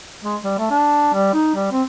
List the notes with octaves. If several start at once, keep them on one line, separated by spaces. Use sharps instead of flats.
G#3
G3
A3
D4
G3
D#4
G3
C4